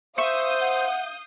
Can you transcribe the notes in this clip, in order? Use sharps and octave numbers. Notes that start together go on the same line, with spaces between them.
C5 E5 F5 C#6 D#6 G6
F#5